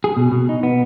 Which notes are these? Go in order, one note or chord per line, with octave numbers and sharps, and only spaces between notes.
G#4
B2
B2
D#4
B3